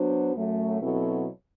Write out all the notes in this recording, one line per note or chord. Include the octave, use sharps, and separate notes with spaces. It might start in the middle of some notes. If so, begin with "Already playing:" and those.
Already playing: F#3 B3 D4 F#4 C5
F#2 F#3 A3
B2 F#3 C4 E4 A4